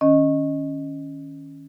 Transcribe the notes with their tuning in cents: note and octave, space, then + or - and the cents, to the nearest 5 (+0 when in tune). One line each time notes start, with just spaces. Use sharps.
D#3 +0 C#4 +0 D#5 +0